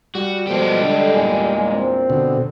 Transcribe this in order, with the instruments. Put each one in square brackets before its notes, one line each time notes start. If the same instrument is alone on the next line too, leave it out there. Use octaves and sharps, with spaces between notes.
[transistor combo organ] G3 [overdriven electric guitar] F#4
[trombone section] B2 F3 [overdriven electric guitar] G#3 G4 [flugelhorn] A4
[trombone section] D3
[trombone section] E2 G2 A#2 [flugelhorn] G#5
[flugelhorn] C4
[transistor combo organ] B2 D3